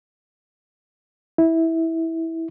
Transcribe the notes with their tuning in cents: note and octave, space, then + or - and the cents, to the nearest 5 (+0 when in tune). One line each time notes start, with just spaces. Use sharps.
E4 -15